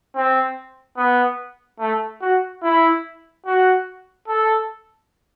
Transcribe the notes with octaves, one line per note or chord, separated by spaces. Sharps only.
C4
B3
A3
F#4
E4
F#4
A4